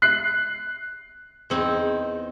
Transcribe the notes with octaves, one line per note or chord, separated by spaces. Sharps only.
F#6 C7
E2 C4 D#4